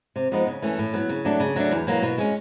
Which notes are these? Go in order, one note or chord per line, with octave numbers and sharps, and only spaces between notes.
C3
F3 G#3 B3 D#4
C#3
E3 A3 C#4
A2
F#3 B3
C#3
F#3 A3 D4
C#3
F#3 A3 D4
E2
B2 F#3 A#3
B2
G#3 C#4